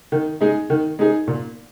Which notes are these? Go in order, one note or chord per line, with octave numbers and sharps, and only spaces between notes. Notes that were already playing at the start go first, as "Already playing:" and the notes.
D#3
G#3 D#4 G#4
D#3
G#3 D#4 G#4
A#2